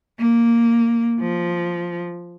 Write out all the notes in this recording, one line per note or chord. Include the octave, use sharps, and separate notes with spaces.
A#3
F3